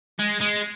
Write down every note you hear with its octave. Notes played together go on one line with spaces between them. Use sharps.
G#3
G#3